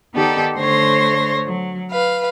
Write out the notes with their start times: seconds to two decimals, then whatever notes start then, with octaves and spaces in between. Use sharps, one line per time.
0.15 D#3 B3 D#4 G4 A4 D5
0.57 D3 A3 C5 C#5 C6 A#6
1.46 F#3
1.91 B4 F5